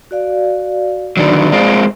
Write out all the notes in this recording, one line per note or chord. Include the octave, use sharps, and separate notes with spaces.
F#4 D5 F5
D3 D#3 F#3 D5 B5
G#3 C4 F4